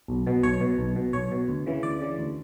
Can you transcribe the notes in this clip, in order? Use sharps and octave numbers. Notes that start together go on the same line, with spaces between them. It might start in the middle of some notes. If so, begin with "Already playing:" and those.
B1
B2
B1 C#5
B2
B1
B2
B1 C#5
B2
D2
C#3 E3
D2 D5
C#3 E3
D2